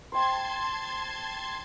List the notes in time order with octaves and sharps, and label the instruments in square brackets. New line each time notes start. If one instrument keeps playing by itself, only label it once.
[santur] C5 G5 [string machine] A5 C6 G#6